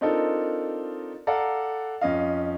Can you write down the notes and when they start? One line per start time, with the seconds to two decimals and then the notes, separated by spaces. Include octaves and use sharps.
0.01 C4 D4 D#4 F4 A4 A#4
1.27 A4 D5 F5 F#5 A#5
2.01 F2 C#4 D#5 F5